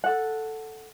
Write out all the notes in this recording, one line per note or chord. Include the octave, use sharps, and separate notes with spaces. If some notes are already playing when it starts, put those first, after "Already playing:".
A4 F#5